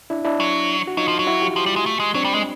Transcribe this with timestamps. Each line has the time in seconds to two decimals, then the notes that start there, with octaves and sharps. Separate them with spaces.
0.10 D4 E4
0.25 D4 E4
0.40 F#3
0.87 F#4
0.97 F#3 D#4 F4
1.08 F3
1.19 F#3
1.27 E4 F#4
1.42 F4 G4
1.56 F3
1.66 G3
1.76 G#3
1.86 A3
2.00 G#3
2.14 F#3 C4 D4
2.25 G3
2.34 G#3